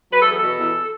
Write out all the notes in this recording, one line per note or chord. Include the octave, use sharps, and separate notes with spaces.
F#3 B4
A4
E2 G#4
A4
B2
E2